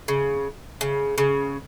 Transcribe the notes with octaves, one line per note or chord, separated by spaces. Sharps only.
C#3
C#3
C#3